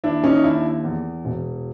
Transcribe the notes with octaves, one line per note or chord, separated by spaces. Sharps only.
D#2 D4 E4
C#4 D#4
D#4
D#2 D4 E4
E2
E1